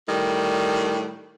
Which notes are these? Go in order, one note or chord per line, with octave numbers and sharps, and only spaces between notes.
A2 D#3 G3